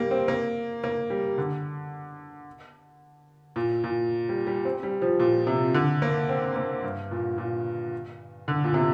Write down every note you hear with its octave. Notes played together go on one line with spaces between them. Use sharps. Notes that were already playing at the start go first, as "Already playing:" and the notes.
Already playing: G3 A#3
C4
A#3
A#3
G3
D3
A#2
A#2
G3
G3
C4
G3
F3
A#2
C3
D3
A#3
C4
A#3
G2
A#2
A#2
D3
A#2
C3